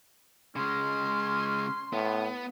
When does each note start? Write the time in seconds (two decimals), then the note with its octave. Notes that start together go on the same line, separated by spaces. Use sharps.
0.56 C#3 G#3 C#4 C6
1.93 A2 B3